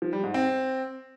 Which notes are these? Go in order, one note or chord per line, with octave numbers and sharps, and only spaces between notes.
F3
G3
G#2
C4